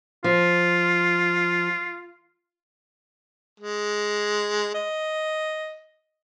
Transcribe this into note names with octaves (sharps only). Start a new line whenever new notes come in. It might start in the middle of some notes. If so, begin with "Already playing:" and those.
F3 F4
G#3
D#5